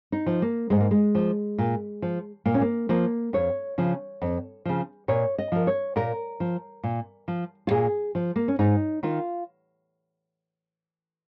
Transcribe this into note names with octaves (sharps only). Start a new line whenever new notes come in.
D#4
F3
A#3
G#2 G#3
A#3
G#3
F3
A#2
F3
A#2 A#3
C#4
A#3
F3 A#3
F2 C#5
C#3 F3
F2
C#3 F3
A#2 C#5
D#5
F3 A#4
C#5
A#2 A#4
F3
A#2
F3
F4
A#2 G#4
F3
A#3
C#4
G#2 D#4
D#3 F4